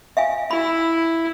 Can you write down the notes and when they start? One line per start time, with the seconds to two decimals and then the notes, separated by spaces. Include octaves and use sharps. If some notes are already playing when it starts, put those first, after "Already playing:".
0.17 E5 F5 G#5
0.51 E4 B5